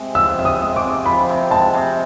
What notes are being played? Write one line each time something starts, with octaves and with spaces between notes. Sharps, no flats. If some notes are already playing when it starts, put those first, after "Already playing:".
Already playing: C3 G#3
F3 E6
C3 E6
D#6
G#3
D6
C3
F3 B5
C3
G#3 A5
C3